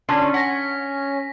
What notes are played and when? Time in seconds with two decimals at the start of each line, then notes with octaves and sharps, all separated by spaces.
0.09 D3 C#4 D4 F4
0.34 F#5 A#6 B6